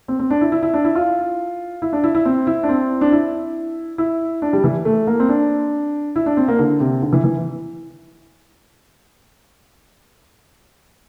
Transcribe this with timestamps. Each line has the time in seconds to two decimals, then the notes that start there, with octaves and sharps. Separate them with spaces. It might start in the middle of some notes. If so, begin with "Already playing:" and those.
0.08 C4
0.19 C4
0.30 D4
0.41 E4
0.52 E4
0.63 E4
0.73 D4
0.84 E4
0.95 F4
1.82 E4
1.93 D4
2.04 E4
2.15 E4
2.25 C4
2.47 E4
2.63 D4
2.69 C4
3.01 D4
3.12 E4
3.98 E4
4.42 D4
4.53 G3
4.64 E3
4.85 A3
5.07 A#3
5.20 C4
5.29 D4
6.16 E4
6.26 D4
6.37 C4
6.48 A#3
6.59 D3
6.80 C3
7.02 D3
7.13 E3
7.24 E3